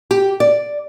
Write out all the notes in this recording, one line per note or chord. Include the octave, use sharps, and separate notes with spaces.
G4
D5